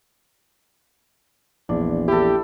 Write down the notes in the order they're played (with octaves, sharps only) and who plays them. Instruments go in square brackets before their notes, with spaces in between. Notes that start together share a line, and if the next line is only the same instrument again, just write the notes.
[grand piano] A#1 [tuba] E2 [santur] D4
[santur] E4 A4 [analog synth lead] G4